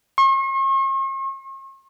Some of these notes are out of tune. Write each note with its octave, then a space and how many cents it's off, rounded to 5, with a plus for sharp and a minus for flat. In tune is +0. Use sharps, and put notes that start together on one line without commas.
C#6 -45